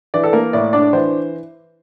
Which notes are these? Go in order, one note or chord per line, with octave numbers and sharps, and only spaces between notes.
E3 D5
A4
A#3 A#4
A2 D5
D4 D5
E3 C5